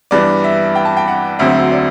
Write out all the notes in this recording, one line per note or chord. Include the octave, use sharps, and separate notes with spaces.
G2 E3 B3 D4 D5
E5
G5
A5
G5
F#5
E1 D2 D3 F#3 C4 E5
D5